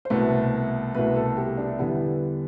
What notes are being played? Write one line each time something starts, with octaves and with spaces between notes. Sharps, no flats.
C5
C2 B2 A3 B4
C2 B2 A3 B4
A4
G4
D4
E2 D3 G3 B3 E4